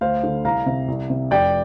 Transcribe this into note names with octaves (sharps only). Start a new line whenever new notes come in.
D2 C5 F5
D3
C2 F5 A#5
C3
C2
C3
F1 D5 G5